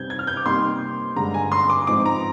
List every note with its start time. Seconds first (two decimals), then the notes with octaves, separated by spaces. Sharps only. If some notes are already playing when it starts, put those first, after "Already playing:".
Already playing: C3 G3 C4 D#4 G6 G#6
0.10 G#6
0.19 F6
0.27 G6
0.37 D6
0.46 C3 G3 A#3 D#4 C6
1.16 G2 D3 G#3 A#5
1.34 G#5
1.52 C6
1.70 D6
1.87 G#2 F3 C4 D#4 D6
2.06 A#5